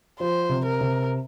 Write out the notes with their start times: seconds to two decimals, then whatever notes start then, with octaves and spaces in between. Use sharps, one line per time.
0.20 F3 C5
0.49 C3
0.65 A#4
0.81 C3